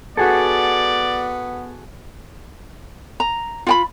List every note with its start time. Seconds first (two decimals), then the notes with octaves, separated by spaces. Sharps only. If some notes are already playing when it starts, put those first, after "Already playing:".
0.17 B3 F#4 G#4 A4 D5
3.20 A#5
3.67 F4 G5 B5